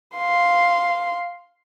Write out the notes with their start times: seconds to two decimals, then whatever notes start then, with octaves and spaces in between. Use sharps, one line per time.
0.16 F5 C6